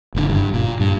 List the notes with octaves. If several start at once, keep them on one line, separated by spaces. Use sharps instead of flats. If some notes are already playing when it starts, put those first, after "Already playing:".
F#1 A2 D3
G2
A#2
G2